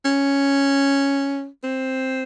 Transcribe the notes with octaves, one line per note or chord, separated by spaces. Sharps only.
C#4
C4